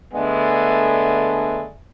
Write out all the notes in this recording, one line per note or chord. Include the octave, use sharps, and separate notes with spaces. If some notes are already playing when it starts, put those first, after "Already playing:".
D3 G#3 A3 B3 D4